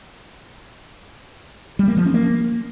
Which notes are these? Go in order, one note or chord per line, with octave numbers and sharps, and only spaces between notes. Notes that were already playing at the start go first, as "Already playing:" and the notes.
G3
A#3
F3
C#4
A#3